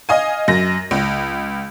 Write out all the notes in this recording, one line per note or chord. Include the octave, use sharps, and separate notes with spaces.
D#5 F5 G#5
F#2 A#6
C#2